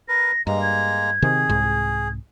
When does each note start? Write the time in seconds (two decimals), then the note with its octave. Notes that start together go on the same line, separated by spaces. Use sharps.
0.08 A#4 B4 A#6
0.47 G2 G#3 A#3 D#5 A#5
0.62 G#6
1.22 C3 D#3 C4 G#4
1.49 C2 G#2